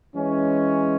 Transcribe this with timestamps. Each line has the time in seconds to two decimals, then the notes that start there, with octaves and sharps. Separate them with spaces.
0.15 E3 G#3 C#4